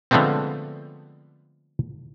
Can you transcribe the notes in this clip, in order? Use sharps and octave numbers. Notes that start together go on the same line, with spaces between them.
D3 F3 G#3 A3 B3 C4